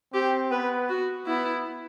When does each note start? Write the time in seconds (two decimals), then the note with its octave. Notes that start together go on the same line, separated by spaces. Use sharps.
0.13 C4 G4
0.51 B3 B4
0.89 F#4
1.26 B3 E4